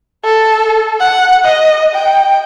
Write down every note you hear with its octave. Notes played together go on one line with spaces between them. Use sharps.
A4
F#5
D#5
G5